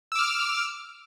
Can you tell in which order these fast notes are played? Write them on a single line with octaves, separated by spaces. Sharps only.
E6 D6 F6